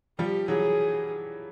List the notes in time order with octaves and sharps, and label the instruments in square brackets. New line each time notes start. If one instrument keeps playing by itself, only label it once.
[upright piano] F3 G3 [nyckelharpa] G4
[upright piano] E3 F#3 [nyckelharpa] G#4